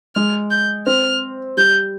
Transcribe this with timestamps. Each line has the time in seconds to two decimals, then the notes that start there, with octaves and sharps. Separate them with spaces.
0.15 G#3 F6
0.51 G6
0.87 C4 F6
1.57 G3 G6